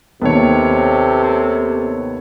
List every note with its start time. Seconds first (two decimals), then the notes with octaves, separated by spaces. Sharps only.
0.21 D#2 C3 D#3 B3 A4 C#5